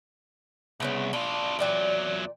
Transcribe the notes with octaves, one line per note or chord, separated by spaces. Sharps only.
C2 C#3 B3 C#4
B2 D4 F4
E2 A#2 F#3 D5 G5